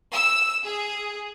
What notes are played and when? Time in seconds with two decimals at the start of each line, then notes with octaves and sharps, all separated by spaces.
0.13 E6
0.66 G#4